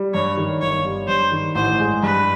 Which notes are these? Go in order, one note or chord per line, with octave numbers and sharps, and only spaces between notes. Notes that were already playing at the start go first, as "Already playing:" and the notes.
Already playing: G3
G2 C#5
D#3
G1 C#5
G3
G2 C5
D#3
A1 C5
G#3
G2 B4